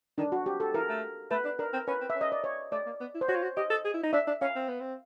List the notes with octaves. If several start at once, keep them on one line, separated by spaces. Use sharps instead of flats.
D#3 D4
F#4
G4
A4
E3 A#4
A3
A3 B4
D4
D4 A#4
C4
C#4 B4
C4
E5
C#4
D#5
D5
C#5
A3 D5
A#3
B3
E4
C5
F#4 C#5
F4
F#4
G4 D#5
A4
G#4
E4
D#4
D4 E5
D4
C#4 F5
C4
B3
C4